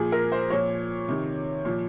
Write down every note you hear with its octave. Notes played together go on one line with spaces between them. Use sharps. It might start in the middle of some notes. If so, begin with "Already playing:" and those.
Already playing: A#2 F3 G#4
A#4
C5
A#2 F3 C#5
C3 D#3
A#2 F3